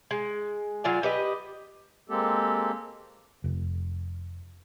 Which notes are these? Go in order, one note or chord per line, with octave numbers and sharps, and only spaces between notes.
G#3
F#3 F4 D5 G#5
G4 B4 D#5
G#3 A#3 C4 G4 A4
F1